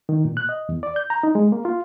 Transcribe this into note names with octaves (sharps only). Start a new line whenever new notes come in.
D#3
A#2
F#6
D#5
E2
D5
G6
A#5
D#4
G#3
A#3
F4